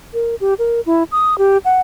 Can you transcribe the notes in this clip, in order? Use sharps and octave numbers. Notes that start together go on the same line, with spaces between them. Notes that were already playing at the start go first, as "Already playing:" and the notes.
A#4
G4
A#4
E4
D#6
G4
F#5